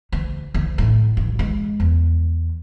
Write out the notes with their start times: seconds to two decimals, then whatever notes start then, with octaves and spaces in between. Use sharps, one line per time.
0.12 D2
0.54 D2
0.78 A2
1.17 G2
1.39 G#3
1.80 E2